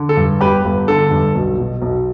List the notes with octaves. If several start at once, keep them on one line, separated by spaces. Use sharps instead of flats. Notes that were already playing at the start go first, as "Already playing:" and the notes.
Already playing: D3
A4
G2
G1 G4 B4
G1
D3 A4
G2
B1
B2
B1